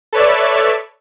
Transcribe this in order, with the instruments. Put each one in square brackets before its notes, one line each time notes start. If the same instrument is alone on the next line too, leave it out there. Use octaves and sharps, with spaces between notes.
[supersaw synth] A4 B4 C#5 D5 E5